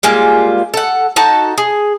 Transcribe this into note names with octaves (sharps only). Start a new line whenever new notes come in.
G3 G#3 A#3 F4
A4 F#5
D#4 F#4 A4 A5
G#4